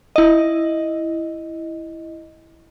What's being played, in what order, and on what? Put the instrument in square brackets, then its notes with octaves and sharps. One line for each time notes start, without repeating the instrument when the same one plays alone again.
[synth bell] E4 D#5